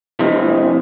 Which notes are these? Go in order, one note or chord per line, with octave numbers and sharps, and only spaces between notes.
F2 C3 E3 G#3